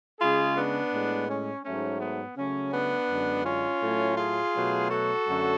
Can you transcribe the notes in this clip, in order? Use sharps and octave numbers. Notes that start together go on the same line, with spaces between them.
C#3 G#3 F4 G#4
B3 D4
A2 G#3
C#4
G#2 F#3 A3 C#4
B3
C#3 F#3 A3 C#4
B3 D4
F#2 D3 G#3
C#4 F4
A2 F#3 A3
F4 G#4
B2 F#3 A3
F#4 A4
F#2 D3 F#3 A3